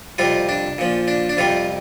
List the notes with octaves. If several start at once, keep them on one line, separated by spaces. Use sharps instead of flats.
F2 C3 G3 F4
D4
A#2 F3
D4
D4
F2 C3 G3 F4